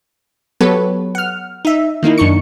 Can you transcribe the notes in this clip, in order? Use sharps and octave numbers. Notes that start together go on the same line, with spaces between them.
F#3 B3 G4 A4 B4 C#5
F#5 F6
D#4 E5
D#3 A#3 D#4 E4
F#2 D4 D#4 C#6 C#7